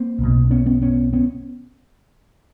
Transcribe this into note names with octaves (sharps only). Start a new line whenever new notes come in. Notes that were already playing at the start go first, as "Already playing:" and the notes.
Already playing: A#3 C4
B1 B2
B3 C#4
B3 C#4
B3 C#4
B3 C#4